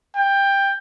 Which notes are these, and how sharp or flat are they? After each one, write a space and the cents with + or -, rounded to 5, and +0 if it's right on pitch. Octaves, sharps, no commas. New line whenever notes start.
G5 +15